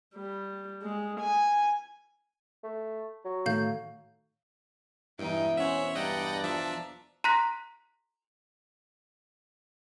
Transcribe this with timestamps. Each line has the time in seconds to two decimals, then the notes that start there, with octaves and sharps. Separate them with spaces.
0.15 G3
0.82 G#3
1.20 G#5
2.64 A3
3.25 F#3
3.46 A2 D#3 A3 F5 G6
5.19 E1 G2 B3 D#4 E4 G5
5.57 C#4 C5 C#5 E5 F#5
5.95 G2 D5 D#5 F#5 G5 A#5
6.44 F3 D4 E5 A5
7.24 A#5 C6 F#6 A#6 B6